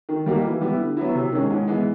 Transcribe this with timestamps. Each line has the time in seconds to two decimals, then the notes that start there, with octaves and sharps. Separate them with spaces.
0.09 D#3
0.26 G3 A#3 D#4 F#4
0.44 E3
0.61 G3 B3 E4
0.79 D3
0.97 F#3 B3 E4
1.14 C3
1.32 D#3 G#3 C#4
1.50 G#2
1.67 E3 G#3 B3